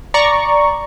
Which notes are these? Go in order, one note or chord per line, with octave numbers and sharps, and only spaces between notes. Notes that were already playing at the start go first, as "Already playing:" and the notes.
D5 A#5 C#6